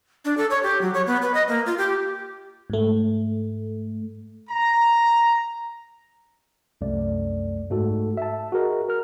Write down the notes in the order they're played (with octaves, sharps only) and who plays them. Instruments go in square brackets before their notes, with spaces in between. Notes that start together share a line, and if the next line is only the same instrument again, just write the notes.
[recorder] D4
A4
C#5
G4
F#3
C#5
B3
B4
D#5
A#3
F4
G4
[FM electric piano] G#2 A3
[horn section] A#5
[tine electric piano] C2 F#2 A3 D5
G#2 A3 F#4 A4
E5 A5
F#4 G#4 A#4 D#5
A#4 F6